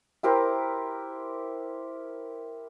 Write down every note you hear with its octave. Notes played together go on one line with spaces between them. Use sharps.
E4 G4 A#4 C5